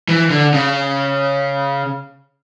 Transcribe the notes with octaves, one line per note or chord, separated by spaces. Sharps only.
E3
D3
C#3